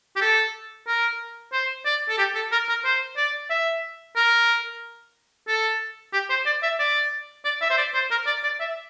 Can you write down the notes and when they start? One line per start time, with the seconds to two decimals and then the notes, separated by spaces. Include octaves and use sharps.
0.16 G4
0.21 A4
0.87 A#4
1.53 C5
1.86 D5
2.09 A4
2.18 G4
2.35 A4
2.52 A#4
2.69 A#4
2.85 C5
3.17 D5
3.50 E5
4.16 A#4
5.48 A4
6.13 G4
6.30 C5
6.46 D5
6.63 E5
6.79 D5
7.45 D5
7.62 E5
7.70 C5
7.78 D5
7.94 C5
8.11 A#4
8.27 D5
8.44 D5
8.60 E5